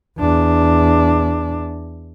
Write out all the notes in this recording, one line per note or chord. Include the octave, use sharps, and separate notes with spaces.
E2 D4